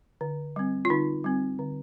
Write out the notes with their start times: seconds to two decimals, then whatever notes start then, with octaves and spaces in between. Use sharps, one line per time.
0.21 D3
0.56 G3 C4
0.85 F4
0.90 D3 D#4
1.24 G3 C4
1.59 D3